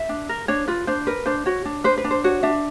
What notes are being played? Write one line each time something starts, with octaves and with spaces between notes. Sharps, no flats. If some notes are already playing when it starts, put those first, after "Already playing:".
Already playing: E5
D4
A#4
D4 C#5
F4 B4
D4 C5
A#4 B4
D4 C5
F#4 C#5
D4
B4 C5
B4
D4
C5
F#4 C#5
D4 E5